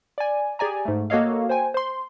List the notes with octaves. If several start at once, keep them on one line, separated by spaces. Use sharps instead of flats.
D5 G#5
G4 G#4 D5 G#5 A#5
G#2 A3
A#3 F#4 A4 C#5 D#5 F5
C5 G5 G#5
C5 C6